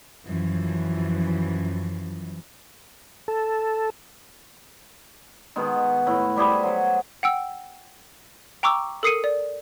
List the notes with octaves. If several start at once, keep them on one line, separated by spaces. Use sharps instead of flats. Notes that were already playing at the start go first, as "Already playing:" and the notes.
F#2 E3 F3
A4
B2 D#3 G#3
A2
G3 G4 G#4 C5
F#3 C5
F#5 G5 E6
G5 A#5 C#6 D6 E6
A4 A#4 D#6 C7 C#7 D#7
D5